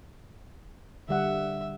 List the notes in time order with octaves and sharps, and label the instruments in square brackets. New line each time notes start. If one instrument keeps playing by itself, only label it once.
[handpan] D3 G3 F#5 [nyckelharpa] E5